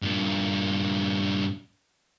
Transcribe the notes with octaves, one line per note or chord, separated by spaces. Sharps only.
G2 A#2